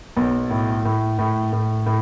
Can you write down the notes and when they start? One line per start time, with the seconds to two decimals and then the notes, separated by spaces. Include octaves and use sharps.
0.17 B1
0.50 A2
0.85 A2
1.19 A2
1.52 A2
1.86 A2